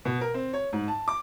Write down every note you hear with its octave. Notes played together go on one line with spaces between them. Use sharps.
B2
A#4
C4
C#5
G#2
A5
D6